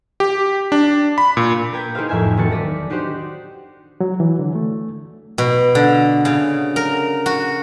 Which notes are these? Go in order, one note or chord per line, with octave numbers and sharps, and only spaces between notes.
G4
D4
B5
A#2
A#4 B4 G5 G6 G#6
D#4 E4 G#4 A#4 C5 F5
F#1 F2 A2 E5 F5 G#5
E1 D#3 B3 F#4 A5 C#7
D5 A#6 B6 D#7
D4 D#4 F#4 G4 C5 D5
F#3
E3
D3
A3
B2
D3
C#3
A#4
F#4